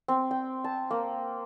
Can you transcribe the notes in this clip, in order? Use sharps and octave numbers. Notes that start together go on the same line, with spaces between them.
C4
G5
A5
A#3